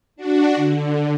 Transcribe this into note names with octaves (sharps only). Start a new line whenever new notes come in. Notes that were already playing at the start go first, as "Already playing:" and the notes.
D4 F#4
D3